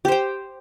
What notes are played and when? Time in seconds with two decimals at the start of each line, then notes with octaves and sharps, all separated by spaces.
0.05 G4
0.08 C5
0.12 G5